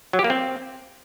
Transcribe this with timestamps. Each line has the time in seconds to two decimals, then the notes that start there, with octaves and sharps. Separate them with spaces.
0.13 F#3
0.19 G4
0.24 A#3
0.30 C4